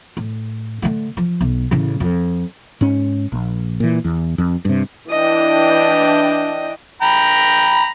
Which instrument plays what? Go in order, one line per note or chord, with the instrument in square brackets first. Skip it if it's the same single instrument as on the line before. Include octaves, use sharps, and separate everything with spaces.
[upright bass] A2
D3 A3
F3
B1
A1 C#3
F2
[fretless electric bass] G#2 C#4
A#1
A#2 E3
E2
F2
G2 C3
[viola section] E3 D4 G5 [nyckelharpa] D#5
[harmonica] G5 A#5 B5